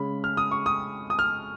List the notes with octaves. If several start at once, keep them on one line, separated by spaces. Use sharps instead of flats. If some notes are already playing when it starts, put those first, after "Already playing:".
Already playing: C#3 G#3 C#4 B5
F6
D#6
C#6
D#6
D#6
F6